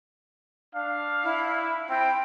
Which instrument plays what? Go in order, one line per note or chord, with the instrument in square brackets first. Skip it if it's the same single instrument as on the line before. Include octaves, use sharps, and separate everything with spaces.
[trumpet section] D4 F5
[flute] E4
[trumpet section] E5
[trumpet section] C4 E4 [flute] G5